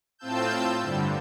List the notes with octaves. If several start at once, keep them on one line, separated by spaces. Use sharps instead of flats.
A2 C4 F4 A5 E6 G6
G2 D3 G3